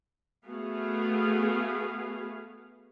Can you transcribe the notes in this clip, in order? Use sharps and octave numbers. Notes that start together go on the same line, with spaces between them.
A3 B3 F#4 G#4 F5